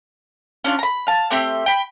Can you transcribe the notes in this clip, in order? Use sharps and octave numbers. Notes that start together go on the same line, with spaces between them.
C#4 D4 F4
A#5 B5
F5 A5
A3 C4 G4
G5 B5